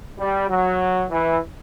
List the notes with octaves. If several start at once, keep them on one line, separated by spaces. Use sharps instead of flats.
G3
F#3
E3